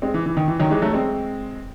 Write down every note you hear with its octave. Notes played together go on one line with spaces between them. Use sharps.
G#3 C4
E3
E3
D#3
E3
D#3 F#3
E3 G#3
F#3 A3
G#3 C4